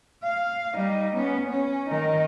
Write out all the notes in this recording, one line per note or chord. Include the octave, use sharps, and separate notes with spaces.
F5
G3 D#4
B3 C#4
C#4
D#3 D#4